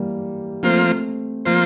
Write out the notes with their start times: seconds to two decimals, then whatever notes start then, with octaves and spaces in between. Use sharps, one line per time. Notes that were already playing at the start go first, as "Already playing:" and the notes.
Already playing: E3 G3 A#3
0.63 F3 A3 A#3 C4 F4 C5
1.45 F3 A#3 F4 C5